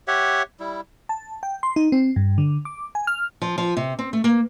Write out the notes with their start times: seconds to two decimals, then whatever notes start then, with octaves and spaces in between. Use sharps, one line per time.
0.08 G4 C#5 E5 F#5
0.60 G3 E4
1.09 A5
1.43 G5
1.63 C6
1.76 D#4
1.92 C4
2.16 G2
2.38 D3
2.65 D6
2.95 G#5
3.07 F6
3.42 F3
3.58 F3
3.77 C3
3.99 C4
4.13 A3
4.24 A#3